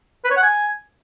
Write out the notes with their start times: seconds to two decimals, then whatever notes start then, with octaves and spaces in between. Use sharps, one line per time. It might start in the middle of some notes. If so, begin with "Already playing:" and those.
0.25 B4
0.31 C#5
0.37 F#5
0.43 G#5